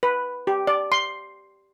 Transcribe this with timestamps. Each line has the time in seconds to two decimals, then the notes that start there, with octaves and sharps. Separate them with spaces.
0.03 B4
0.47 G4
0.67 D5
0.92 C6